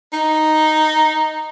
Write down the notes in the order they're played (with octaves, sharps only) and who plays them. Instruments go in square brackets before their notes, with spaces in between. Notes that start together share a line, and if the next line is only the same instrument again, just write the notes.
[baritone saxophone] D#4